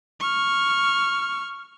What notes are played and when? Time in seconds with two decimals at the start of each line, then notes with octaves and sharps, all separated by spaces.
0.20 C#6 F6